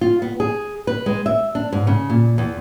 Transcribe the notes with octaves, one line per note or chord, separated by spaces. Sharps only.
F4
B3
G#4
B4
G#3
E5
D4
G#2
C#3
A#2
E2